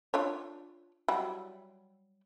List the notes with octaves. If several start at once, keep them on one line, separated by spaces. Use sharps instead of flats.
D4 F4 C#5
F#3 G3 E4